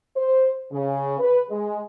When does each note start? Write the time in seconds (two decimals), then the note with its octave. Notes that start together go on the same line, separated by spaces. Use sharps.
0.16 C5
0.72 C#3
1.20 B4
1.49 G#3